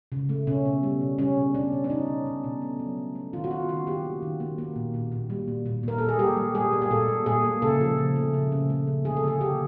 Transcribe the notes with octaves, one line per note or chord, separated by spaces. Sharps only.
C#3
A3
B2 C#4
B2
G3
B2
G3 C#4
B2
B2 D4
B2
D4
B2 D#4
B2
B2
B2
A3
F#3
F#3
A3
D#3 F4
F#4
A#3 F4
D#3 F#4
A#3 G4
D#3
D#3
A#3
A#3
A#2
A#2
A#2
G3
A#2
A#2
A#2 A#4
A#2 A4
G#4
G3 G4
G3
G3 G#4
A#3
G#4
A#2 A4
A#3
A#2 G#4
A#3
C#3 A4
F3
C#3
A3
C#3
C#3
A3
C#3
D3 G#4
A4
A#3 G#4
D3 G4